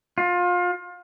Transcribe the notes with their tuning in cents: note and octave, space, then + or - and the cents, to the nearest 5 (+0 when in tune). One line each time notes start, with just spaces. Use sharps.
F4 +25